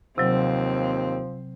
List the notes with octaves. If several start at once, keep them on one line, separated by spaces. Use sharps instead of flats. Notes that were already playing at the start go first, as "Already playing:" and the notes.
D#2 C3 F3 F#3 C4